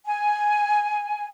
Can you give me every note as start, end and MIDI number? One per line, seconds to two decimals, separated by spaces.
0.05 1.27 80